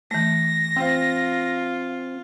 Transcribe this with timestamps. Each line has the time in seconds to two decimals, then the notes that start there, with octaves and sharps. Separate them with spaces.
0.11 E3 A3 A#6
0.76 C4 F4